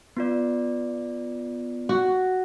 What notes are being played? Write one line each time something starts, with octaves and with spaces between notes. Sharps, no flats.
B3 F4 D5
F#4